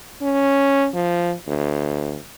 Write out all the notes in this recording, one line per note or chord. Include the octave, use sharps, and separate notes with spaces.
C#4
F3
D2